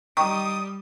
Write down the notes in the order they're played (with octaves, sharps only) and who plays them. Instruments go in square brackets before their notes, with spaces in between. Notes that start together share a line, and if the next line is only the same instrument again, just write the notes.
[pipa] D#3 G4 [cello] G3 [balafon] C#6 [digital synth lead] D#6